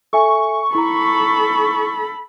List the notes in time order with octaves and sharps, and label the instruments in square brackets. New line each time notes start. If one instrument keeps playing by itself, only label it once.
[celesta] A4 E5 G#5 [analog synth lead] C#6
[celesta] E4 A#5 [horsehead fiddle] A4 B5